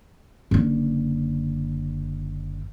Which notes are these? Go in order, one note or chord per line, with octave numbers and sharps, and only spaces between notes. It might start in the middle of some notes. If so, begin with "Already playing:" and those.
F#1 D3